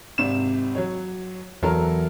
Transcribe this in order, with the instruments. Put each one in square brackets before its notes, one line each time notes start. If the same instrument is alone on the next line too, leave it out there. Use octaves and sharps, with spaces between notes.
[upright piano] G#1 C3 E7
F#3 C#5
[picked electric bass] E2 [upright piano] F#3 A4 A#4